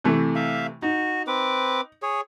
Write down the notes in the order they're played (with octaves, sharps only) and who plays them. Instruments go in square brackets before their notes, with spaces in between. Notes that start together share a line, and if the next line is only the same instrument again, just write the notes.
[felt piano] C3 E3 A3
[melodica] E5 F5
[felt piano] D#4 [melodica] F#4
[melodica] C4 B4 D6
G#4 C#5